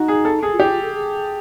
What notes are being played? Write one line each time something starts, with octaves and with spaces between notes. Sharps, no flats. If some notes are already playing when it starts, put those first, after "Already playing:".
Already playing: D#4 F#4
G#4
A4
G#4
F4
E4 G4
F4
A4
G#4